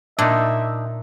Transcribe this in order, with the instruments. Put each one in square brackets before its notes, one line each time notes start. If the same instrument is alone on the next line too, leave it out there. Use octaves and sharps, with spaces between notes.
[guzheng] A#2 [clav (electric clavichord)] D4 D#4 [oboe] E5